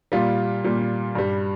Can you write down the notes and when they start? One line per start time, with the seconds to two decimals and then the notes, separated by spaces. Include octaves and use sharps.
0.12 A#2 G3 F4
0.64 A#2 G3
1.15 G2 G3